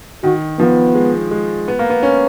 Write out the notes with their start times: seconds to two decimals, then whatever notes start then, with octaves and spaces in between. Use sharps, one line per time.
0.23 D#3 F#4
0.59 F3 B3
0.95 G#3
1.31 G#3
1.68 B3
1.79 A#3
1.90 B3
2.03 C#4